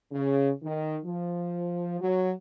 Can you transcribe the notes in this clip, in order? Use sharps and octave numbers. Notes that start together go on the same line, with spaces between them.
C#3
D#3
F3
F#3